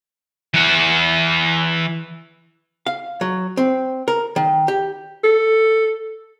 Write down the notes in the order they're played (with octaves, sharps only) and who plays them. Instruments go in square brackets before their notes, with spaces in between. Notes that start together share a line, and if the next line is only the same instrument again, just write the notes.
[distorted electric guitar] E3 F#5
[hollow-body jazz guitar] F5
F#3
C4
A#4
D#3
G4
[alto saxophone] A4